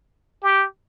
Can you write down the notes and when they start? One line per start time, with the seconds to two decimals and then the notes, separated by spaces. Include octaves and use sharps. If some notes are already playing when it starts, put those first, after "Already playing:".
0.43 G4